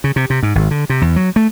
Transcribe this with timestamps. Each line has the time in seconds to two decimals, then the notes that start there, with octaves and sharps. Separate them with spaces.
0.04 C#3
0.16 C3
0.30 C3
0.43 G#2
0.55 G#1
0.71 D3
0.90 C3
1.01 E2
1.16 F#3
1.36 A3